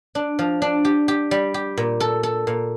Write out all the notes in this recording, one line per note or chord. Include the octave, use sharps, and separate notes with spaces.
D4
F3
D4
G4
G4
G3
G4
A#2
A4
A4
A#2